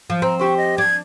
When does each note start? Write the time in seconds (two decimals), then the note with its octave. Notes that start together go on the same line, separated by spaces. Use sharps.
0.10 F3
0.22 C4 A#5
0.39 G4 C5 C#6
0.57 D#5
0.78 D4 G#6